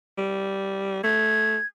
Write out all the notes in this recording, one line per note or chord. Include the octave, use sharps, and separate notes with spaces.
G3
A3 G#6